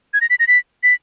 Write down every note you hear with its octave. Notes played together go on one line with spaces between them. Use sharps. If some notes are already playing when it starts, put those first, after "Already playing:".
G#6
A#6
B6
A#6
B6
B6